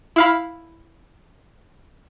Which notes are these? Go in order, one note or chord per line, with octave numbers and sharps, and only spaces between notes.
E4 F5 B5